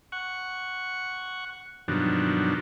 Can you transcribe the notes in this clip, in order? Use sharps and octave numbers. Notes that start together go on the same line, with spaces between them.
F#5 C#6
G2 B2 D#3 F3 F#3 D4